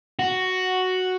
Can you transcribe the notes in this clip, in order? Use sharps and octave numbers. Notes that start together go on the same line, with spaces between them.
F#4